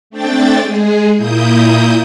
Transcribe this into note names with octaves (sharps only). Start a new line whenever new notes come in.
A3 C4 D4 G5 A6
G#3 G#4
A#2 A#3 E4 D#6 G6